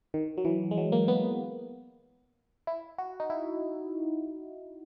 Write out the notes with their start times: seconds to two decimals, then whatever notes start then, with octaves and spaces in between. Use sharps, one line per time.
0.14 D#3
0.38 F#3
0.45 E3
0.71 G#3
0.77 F#3
0.92 A#3
1.08 B3
2.67 E4
2.98 F#4
3.20 D#4
3.30 E4